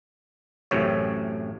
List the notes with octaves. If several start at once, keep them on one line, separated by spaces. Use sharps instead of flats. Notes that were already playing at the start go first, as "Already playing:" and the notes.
A1 F#2 A2 C3 C#5